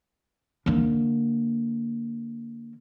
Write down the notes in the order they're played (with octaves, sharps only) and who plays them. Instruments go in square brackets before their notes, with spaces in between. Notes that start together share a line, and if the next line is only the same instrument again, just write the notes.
[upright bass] D3 A#3